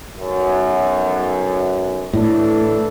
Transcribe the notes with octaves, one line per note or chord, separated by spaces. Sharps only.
B1 F#2
A2 E3 D4 A4